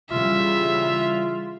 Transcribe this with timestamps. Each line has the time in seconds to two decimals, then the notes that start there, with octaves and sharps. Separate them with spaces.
0.11 C#3 E3 G3 F4 E5